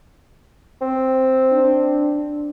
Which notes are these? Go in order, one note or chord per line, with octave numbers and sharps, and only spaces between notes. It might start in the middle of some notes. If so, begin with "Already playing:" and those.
C4
D4